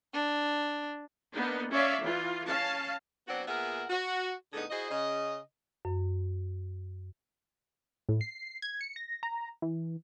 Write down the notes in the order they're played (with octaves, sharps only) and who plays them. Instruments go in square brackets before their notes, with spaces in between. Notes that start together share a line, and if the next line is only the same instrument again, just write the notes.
[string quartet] D4
[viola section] A#3 B3 D4 D#4
C#4 C#5 D5 E5 F5
E3 F4
C#4 F5 A5
[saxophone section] F#3 B3 C4 D4 F#4
A#2 B3 G#4 A#4 E5 F#5
F#4
A2 D3 B3 D#4 G#4 A4
E4 F#4 G#4 C5 D#5
C#3 D#5
[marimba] F#2
[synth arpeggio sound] A2
C7
G#6
C#7
A#6
A#5
E3